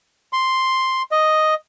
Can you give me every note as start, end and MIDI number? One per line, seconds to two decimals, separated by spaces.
0.33 1.02 84
1.11 1.54 75